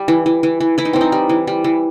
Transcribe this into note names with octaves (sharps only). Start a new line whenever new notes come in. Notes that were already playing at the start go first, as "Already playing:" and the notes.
Already playing: G3
E3
E3
E3
E3
E3 E4
D#4
E3 C4
D#4
G3
E3
G3
E3